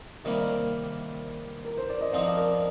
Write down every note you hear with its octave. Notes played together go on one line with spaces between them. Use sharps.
C3 D#3 G3 A#3 A#4 D5
A#4
C5
D5
D#5
F3 C4 D#4 D5 F5
A#4 D5